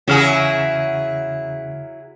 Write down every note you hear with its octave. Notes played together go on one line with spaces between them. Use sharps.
E2 C#3 F#3 E4 G#4 F6